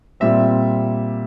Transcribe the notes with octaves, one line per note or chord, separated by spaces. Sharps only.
A#2 G3 C4 E5